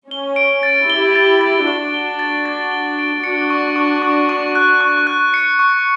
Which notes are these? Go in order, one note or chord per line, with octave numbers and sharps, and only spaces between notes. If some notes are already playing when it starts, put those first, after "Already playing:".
C#4 G7
D7
A6
E4 G4 G7
A6
A6
D4 F#4 G7
G7
A6
A6
G7
D7
D4 F#4 C#7
C#6
C#6
C#6
C#6
F#6
C#6
F#6
C#7
C#6